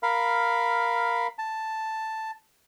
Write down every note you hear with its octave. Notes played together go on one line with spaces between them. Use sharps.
A#4 F5 B5
A5